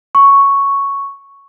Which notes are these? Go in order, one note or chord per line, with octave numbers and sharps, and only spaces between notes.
C#6